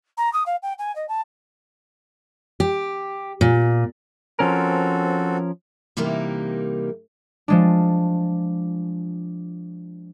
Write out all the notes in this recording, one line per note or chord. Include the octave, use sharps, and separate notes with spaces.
A#5
D#6
F5
G5
G#5
D#5
A5
G4
A#2
F3 C4 C#4 F#4 A4 A#4
C3 E3 G3 A#3 D#4 A#4
F3 G#3 D4